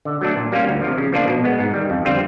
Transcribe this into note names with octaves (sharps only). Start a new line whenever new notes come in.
D3
F#3 A3 D4
A#2
G3 A#3 C#4 F4
D2
F3
C3
C#3
F3 A#3 D4 F4
B2
G#3 B3
G#2
D#3 G3
F2
D3 G3 C4 F4